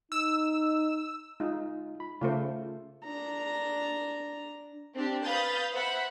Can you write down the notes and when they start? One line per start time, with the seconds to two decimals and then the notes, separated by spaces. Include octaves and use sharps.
0.12 D#4 E6
1.40 G#3 D#4 F4
2.00 B5
2.21 C#3 A3 F4 C5
3.04 D4 A#5
4.94 C4 D4 G4
5.24 B4 F5 B5 D#6 G6 A6
5.73 C5 E5 F#5 B5